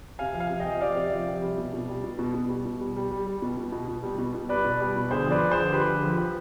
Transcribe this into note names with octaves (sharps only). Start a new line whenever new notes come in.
C3 F5 G#5
F3
F5 G#5
C3
D#5 G5
F3
C3 D5 F5
C3
F3
C3
G3
B2
B2
G3
B2
B2
B2
G3
B2
G3
G3
G3
G3
B2
B2
B2
B2
G3
B2
B2
G3 B4 D5
B2
G3
B2
D3 G#4 C5
F3 B4 D5
F3
G#4 C5
D3
F3 G4 B4
D3
F3
F3